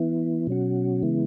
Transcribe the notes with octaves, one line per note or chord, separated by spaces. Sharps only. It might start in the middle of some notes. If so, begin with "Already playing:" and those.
Already playing: E3 B3 E4
B2 F#3 C#4 F#4
C#3 E3 G#3 B3 E4